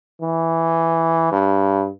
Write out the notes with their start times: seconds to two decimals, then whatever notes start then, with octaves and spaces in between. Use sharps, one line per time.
0.22 E3
1.32 G2